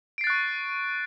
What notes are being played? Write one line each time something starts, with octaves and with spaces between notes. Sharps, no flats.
C#6 F#6 A6 C7 D7